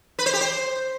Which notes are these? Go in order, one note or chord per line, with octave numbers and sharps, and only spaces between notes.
B4
C5
G4
C5